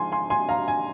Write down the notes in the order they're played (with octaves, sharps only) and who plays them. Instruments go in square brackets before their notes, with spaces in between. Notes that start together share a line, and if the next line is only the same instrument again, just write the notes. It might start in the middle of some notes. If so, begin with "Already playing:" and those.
Already playing: [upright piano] G#2 F3 G#3 G#5 C6
G#5 C6
G#5 C6
F5 A#5
G#5